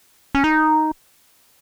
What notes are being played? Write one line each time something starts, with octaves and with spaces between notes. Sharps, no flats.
C#4
D#4